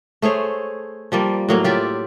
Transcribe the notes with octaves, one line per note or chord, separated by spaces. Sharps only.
A3 G#4 C5 C#5
F3 G3 A#3
A2 F#3 A#3
F4 G4 D5 E5